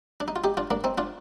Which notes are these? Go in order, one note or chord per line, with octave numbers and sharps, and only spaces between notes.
D4
D#4
F4
D#4 G4
D4 F4
A#3 D4
C4 D#4
D4 F4